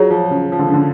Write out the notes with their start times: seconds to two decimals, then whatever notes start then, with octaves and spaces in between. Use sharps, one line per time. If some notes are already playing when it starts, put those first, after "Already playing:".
Already playing: F#3 F4 G#4 C#5
0.10 F3
0.31 C#3
0.52 F3
0.59 D3
0.67 C#3
0.74 D3